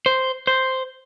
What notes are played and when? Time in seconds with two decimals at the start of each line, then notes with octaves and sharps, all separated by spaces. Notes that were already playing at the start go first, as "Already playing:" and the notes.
0.06 C5
0.47 C5